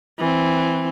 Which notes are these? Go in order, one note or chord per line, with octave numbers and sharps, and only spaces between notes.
E3 C4